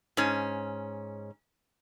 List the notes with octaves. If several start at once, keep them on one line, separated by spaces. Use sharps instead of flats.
G#2 C#4